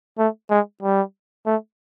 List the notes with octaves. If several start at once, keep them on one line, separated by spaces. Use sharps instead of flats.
A3
G#3
G3
A3